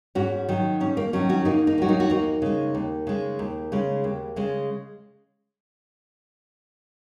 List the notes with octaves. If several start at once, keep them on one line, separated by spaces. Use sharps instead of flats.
G#2 C#4 F#4
D#3 F#3
G#2 C#4
A#3
D#3 F#3 C#4
C#4 F#4
G#2 A#3 D#4
A#3 D#4
D#3 F#3 F#4
A#3 D#4
F#4
D#2 A#3 D#4
C#3 G#3
D#2
C#3 G#3
D#2
C#3 G#3
D#2
C#3 G#3